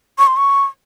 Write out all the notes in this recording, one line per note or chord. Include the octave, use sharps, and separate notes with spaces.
C#6
C6
C#6